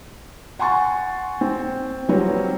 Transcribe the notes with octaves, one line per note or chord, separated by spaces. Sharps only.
F#5 G#5 C6 C#6 A6
C4
F#3 G3 C4 F4 B4 C#5